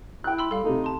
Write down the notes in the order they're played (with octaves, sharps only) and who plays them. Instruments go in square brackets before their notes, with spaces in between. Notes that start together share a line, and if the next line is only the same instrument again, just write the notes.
[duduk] E4 [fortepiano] G5 F#6
[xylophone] B5 C6 E6
[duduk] G3 [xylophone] A4 F5
[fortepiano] C3 A3 [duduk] D#4
[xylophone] A5 C6